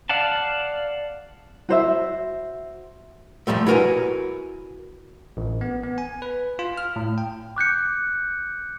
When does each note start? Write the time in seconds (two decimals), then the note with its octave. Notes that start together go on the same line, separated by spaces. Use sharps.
0.09 D5 F5 F#5 A5
1.69 F#4 C5 E5
3.47 A#2 C#3 F3 G3 A3
3.67 E4 F#4 A#4 B4 G#5
5.37 A1
5.61 B3
5.84 B3
5.98 G#5
6.22 B4
6.59 F4
6.78 F6
6.96 A2
7.18 G5
7.56 D6 F#6 G6 C#7